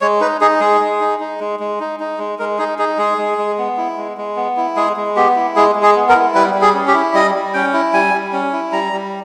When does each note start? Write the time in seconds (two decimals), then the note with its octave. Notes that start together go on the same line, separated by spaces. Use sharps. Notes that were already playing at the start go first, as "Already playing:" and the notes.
0.01 G#3 C#5
0.21 D#4 B4
0.41 D#4 G#4
0.60 G#3 G#4
0.81 G#3
1.00 D#4
1.20 D#4
1.40 G#3
1.60 G#3
1.80 D#4
2.00 D#4
2.19 G#3
2.39 G#3 A#4
2.58 D#4 G#4
2.78 D#4 G#4
2.98 G#3 G#4
3.18 G#3
3.38 G#3
3.58 B3
3.77 E4
3.98 G#3
4.18 G#3
4.37 B3
4.57 E4
4.76 G#3 G#4
4.97 G#3
5.16 B3 G4
5.36 E4
5.56 G#3 G#4
5.75 G#3
5.83 G#4
5.96 B3
6.09 A#4
6.15 E4
6.35 G3 B4
6.54 G3
6.62 G#4
6.74 C#4
6.88 G4
6.94 E4
7.14 G3 D#5
7.35 G3
7.54 C#4 G5
7.73 E4
7.93 G3 G#5
8.14 G3
8.33 C#4
8.53 E4
8.72 G3 A#5
8.92 G3